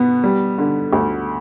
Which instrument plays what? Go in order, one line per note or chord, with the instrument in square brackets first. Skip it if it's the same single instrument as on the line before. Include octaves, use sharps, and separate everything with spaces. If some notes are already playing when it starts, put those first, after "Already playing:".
Already playing: [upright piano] B2 B3
G3
D3
D2